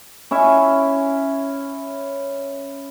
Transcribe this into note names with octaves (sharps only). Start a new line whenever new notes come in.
C#4 E4 E5